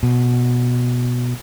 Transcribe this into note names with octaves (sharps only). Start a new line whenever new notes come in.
B2